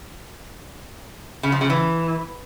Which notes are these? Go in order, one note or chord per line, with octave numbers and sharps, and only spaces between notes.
C#3
F3
C#3
E3